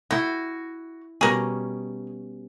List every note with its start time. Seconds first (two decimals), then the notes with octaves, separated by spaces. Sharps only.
0.11 E4 F#4 G5
1.21 B2 G3 C#4 G#4 A#4